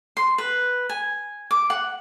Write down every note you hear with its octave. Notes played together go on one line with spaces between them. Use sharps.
C6
B4
G#5
D6
F#5